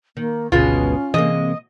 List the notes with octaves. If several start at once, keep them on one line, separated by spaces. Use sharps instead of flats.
D#3 A#3
G#1 D2 B2 G#3 B3 C#4 F4
C3 E3 G#3 A#3 D#5